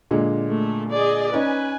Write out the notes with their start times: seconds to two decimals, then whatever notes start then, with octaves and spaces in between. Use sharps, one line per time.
0.11 A#2 D3 G#3
0.50 A3
0.92 G#4 D5 D#5
1.34 C#4 D#4 B4 G#5